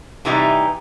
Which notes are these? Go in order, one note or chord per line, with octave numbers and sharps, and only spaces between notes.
C3 E3 G3 D#4